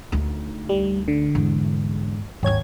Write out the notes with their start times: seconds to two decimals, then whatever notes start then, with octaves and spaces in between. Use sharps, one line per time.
0.12 D2 D#4
0.69 G3
1.08 D3
1.35 E2 G#2
2.43 G#1 D#2 D#3 C#5 G#6